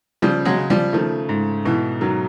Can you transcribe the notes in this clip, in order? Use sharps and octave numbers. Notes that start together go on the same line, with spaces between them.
C#3 F3 G3
F#3 G#3
C#3
F3 G3
D#3 F3 A3
G#2
B2 E3
D#3 F#3